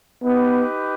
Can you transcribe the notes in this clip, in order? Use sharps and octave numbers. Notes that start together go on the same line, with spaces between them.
B3 D#4 G4 B4